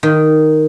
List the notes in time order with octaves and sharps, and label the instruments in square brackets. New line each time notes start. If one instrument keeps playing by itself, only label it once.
[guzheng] D#3